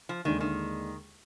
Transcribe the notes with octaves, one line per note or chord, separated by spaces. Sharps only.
F3
D#2 D3 D#3 G#3 D4 G#4
D#3